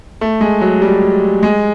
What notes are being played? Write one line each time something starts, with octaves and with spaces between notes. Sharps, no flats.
A3
G#3
F#3
G3
G#3